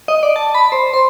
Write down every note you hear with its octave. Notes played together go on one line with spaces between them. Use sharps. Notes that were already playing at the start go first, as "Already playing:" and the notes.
D#5
D5
A5
B5
C5
C6